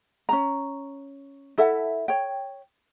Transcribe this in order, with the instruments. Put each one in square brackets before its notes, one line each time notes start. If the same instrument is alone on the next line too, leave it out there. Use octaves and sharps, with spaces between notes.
[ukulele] C#4 D4 A#5
E4 A4 E5 F#5
C#5 G5